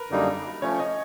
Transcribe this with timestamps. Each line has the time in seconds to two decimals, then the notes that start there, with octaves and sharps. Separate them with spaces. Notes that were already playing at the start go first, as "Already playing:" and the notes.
Already playing: A#4 B4
0.10 F#2 D3 G3 A#3 D#4
0.62 F3 A3 C#4 C#5
0.79 D#5